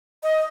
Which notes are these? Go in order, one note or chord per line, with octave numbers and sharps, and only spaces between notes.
D#5